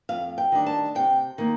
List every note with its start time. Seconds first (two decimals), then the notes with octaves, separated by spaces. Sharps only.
0.09 F2 F5
0.38 G5
0.52 D#3 G3 D4
0.66 A5
0.95 C3 G5
1.38 D#3 A#3